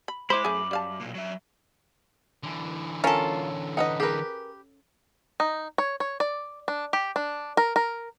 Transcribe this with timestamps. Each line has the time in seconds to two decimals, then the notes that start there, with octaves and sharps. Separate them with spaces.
0.08 B5
0.30 G#3 E4 C5 B5 D6
0.45 F#2 A3 G#4
0.71 G3 F5 A5
1.00 B1 A#2
1.15 F#3 E5
2.43 D3 E3
3.04 C#4 F4 A4 A#4
3.77 D#4 B4 D#5 F#5
4.00 G4 G#4 A#4 B4
5.40 D#4
5.78 C#5
6.00 C#5
6.20 D5
6.68 D4
6.93 G4
7.16 D4
7.57 A#4
7.76 A#4